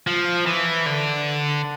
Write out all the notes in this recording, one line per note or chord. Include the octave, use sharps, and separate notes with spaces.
F3
E3
D3